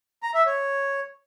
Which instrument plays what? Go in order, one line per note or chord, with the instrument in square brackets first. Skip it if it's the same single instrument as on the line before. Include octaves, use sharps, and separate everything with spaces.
[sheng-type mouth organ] A#5
E5
C#5